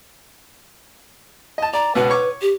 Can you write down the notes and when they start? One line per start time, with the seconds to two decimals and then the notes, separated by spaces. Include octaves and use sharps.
1.58 D#5 A5
1.74 D5 A#5
1.95 C#2 B2 B4 F#5
2.10 C#5 C#6 D6
2.42 G4